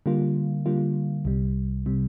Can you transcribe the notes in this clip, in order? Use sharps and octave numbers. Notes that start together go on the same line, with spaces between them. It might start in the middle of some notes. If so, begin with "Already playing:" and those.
D3 G3 A#3 F4
D3 G3 A#3 F4
C2 C3 G3
C3 G3